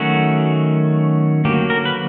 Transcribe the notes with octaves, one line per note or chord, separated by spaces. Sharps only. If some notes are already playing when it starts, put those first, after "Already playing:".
Already playing: D#3 F#3 A3 C#4 F#4
D3 F#3 A#3 G4
A#4
B4